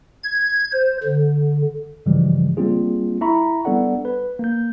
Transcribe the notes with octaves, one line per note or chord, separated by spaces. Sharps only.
G#6
C5
D3
G2 C#3 E3 F3 G3 G#3
G3 A#3 C4 D4 F4 G#4
E4 E5 A#5 B5 C#6
G3 B3 D4 A4 D5 F#5
B4
A#3 G6